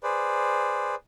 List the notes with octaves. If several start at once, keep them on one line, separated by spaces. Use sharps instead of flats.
G#4 B4 C5 D5